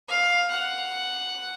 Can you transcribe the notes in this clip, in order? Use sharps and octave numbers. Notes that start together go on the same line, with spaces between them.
F5
F#5